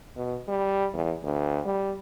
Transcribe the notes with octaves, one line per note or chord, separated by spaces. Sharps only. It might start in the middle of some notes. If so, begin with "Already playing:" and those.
B2
G3
E2
D2
G3